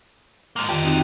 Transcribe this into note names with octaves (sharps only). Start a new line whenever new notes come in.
G#3 A#3
F2 D3 D#3 F#3 G4
C4 D#4 F#4